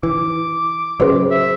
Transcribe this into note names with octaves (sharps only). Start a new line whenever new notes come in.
E3 D6
C#3 F#3 G#4 C5
E5